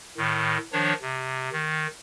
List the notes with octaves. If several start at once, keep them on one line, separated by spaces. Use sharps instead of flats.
A2 D#3
D#3 F3 D4 C#5
C3
D#3